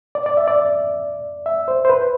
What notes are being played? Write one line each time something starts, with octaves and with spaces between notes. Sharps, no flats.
D5
D5
E5
D5
E5
C5
C5
B4